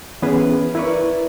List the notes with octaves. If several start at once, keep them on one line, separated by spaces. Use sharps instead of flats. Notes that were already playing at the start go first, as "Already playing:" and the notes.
E3 B3 C#4 G#4 B4
E4 A#4 B4 D5 C#6